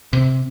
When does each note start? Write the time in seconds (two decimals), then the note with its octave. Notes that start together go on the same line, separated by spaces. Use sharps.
0.13 C3